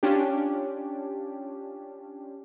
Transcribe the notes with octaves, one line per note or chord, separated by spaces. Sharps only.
C#4 D4 F4 G4